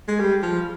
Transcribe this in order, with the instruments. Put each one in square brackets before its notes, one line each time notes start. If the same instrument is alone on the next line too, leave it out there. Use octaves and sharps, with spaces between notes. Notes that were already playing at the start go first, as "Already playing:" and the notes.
[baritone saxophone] G#3
G3
F3